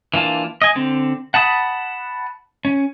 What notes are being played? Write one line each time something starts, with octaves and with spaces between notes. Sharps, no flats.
E3 A#3 D4 F4
D#5 G#5
D3 C4
F#5 A5 B5 D#6
C#4